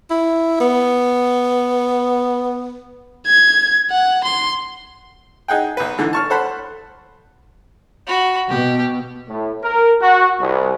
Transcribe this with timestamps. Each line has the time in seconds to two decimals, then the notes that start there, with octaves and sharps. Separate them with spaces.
0.10 E4
0.60 B3
3.27 G#6
3.91 F#5
4.24 C6
5.48 D#4 G#4 F#5 G5
5.77 B1 B4
5.98 G#2 D3 E3
6.13 A5 C#6 F6
6.30 A4 C5 F#5 B5
8.07 F#4 B5
8.49 B2 G4
9.28 A2
9.63 A#4
10.02 F#4
10.41 C2